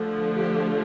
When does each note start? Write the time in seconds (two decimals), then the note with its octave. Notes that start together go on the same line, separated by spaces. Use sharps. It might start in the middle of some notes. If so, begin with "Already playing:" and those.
Already playing: D3 F3 A3
0.35 G4